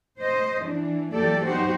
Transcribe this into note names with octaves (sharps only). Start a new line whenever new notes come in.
C5 D#5
E3 D4
E3 F#3 A#3 G4 A4 D5
F#3 B3 D#4 F#4 G4 C5